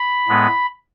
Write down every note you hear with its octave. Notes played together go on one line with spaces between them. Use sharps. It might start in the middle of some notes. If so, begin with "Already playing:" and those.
Already playing: B5
A2 G#3 B3